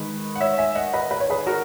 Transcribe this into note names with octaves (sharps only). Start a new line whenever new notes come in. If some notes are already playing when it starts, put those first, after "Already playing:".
Already playing: D#3 G#3 B4
F#5
C#5 E5
E5 G#5
D#5 F#5
B4 D#5
B4
C#5
G#4 B4
F#4 A#4